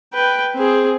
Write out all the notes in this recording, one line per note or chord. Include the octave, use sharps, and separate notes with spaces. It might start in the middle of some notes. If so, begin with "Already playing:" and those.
B4 G5
C4 G#4